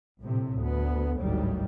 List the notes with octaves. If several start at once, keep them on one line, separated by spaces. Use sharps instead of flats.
A#1 A2 C3
D2 B3
G#1 D2 A2 D#3 F#3 G3